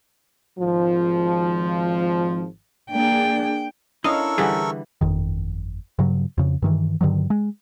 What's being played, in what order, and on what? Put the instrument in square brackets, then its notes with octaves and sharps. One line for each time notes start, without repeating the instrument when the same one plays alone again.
[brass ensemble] G#1 F3
[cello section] A#3 D4 G#4 [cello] G5
[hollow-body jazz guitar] C#4 D4 E4 [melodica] A4 A#4 C#6 [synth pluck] D#5 [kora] F5
[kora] D3 E3 G3 [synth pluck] G#4
[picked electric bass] G1 F2 D#3
G2 C#3 F#3
F2 C#3
G2 D#3 E3
G2 D3 D#3 F#3
G#3